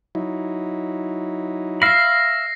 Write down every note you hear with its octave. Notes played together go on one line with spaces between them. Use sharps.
F#3 D#4 E4
E5 F5 B5 A#6 C7